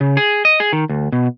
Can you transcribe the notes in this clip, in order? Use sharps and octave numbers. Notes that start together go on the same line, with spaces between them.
C#3
G#4
D#5
G#4
D#3
D2
B2